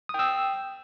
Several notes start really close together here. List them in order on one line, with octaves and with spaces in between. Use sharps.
D#6 G5 E6